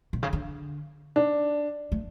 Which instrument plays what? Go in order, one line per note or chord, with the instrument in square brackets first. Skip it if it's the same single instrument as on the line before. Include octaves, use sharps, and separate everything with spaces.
[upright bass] B2
C#3
D3
[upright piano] D4
[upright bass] A3